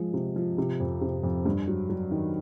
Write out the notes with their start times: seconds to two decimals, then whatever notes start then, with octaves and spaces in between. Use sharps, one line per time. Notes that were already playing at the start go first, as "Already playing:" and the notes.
Already playing: F3 G#3
0.14 C3
0.36 F3
0.58 C3
0.80 F2
1.01 C3
1.23 F2
1.46 G2
1.68 F#3
1.90 F#3
2.11 D#3